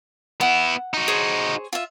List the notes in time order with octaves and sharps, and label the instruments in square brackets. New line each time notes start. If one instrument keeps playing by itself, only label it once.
[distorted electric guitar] B3 E4 [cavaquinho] F#5
[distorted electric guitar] D#4 F#4
[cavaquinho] G#4 C5 C#5
F4 E5